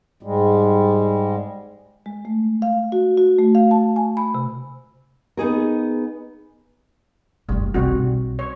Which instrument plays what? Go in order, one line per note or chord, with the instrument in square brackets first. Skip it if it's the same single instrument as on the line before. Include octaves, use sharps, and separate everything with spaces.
[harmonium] G#2 G3 G#3
[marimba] G#3
A3
F5
F#4
F#4
A3
F5
A5
G#5
B5
C3
[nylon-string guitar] B3 D#4 G#4 A#4
[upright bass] F#1 D2 [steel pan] G3
[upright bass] C2 [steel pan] G3 C4 F#4
[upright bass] B1
[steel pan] C#5